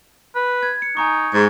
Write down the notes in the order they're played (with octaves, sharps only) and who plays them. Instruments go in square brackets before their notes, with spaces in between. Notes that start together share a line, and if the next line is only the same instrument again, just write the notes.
[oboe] B4
[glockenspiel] G#6
C#7
[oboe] D#4 [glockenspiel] G#5 A#5 C#6
[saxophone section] G#2